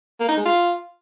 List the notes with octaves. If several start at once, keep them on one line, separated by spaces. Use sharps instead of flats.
A#3
D#4
G#3
F4